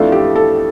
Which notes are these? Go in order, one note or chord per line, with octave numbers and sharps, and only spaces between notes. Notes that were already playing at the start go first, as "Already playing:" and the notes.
Already playing: F2 E3 A3 D4 F4 A4
G4
A4